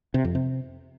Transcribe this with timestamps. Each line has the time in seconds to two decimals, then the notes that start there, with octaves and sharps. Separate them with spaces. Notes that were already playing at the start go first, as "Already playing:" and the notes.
0.14 C3
0.25 F2
0.35 C3